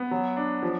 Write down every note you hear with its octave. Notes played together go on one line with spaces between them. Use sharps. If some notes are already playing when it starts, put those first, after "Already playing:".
Already playing: B3
F#3
D4
F3